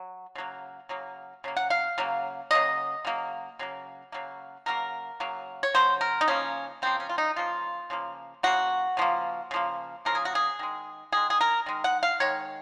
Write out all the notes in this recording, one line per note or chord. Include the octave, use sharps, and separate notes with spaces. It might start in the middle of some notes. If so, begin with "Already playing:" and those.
Already playing: F#3
C#3 F#3 A#3
C#3 F#3 A#3
C#3 F#3 A#3
F#5
F5
C#3 F#3 A#3
C#3 F#3 A#3 D#5
C#3 F#3 A#3
C#3 F#3 A#3
C#3 F#3 A#3
C#3 F#3 A#3 A#4
C#3 F#3 A#3
C#5
C#3 F#3 C5
A#4
D#4
C#3 F3 A#3 C#4
C#3 F3 A#3 C4
C#4
F4
D#4
C#3 F3 A#3 F4
C#3 F3 A#3
C#3 F3 A#3 F#4
C#3 F3 A#3
C#3 F3 A#3
C#3 F3 A#3 A#4
G#4
F#4
G#4
D#3 G#3
D#3 G#3 G#4
G#4
A#4
D#3 G#3
F#5
F5
D#3 G#3 C#5